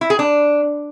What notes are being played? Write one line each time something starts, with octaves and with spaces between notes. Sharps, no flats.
E4
G#4
D4